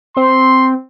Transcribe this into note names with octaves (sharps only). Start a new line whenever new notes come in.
C4 C6